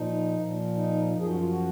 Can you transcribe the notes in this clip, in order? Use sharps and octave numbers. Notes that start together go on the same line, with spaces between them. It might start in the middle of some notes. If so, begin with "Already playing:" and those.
Already playing: A#2 F3 D#4
A#2 F3
D#4
F#2 F3 D#4
G#4
F#4
F4
F#4